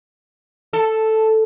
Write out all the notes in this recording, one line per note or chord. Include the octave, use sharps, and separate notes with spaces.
A4